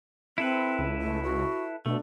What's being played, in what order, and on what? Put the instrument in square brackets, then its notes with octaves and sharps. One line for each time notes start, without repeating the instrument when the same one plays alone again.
[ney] C4 [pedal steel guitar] E4 A4 B4
[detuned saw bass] C#2
[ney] A3
F#4
[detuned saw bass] B2 [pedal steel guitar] A3 [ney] D4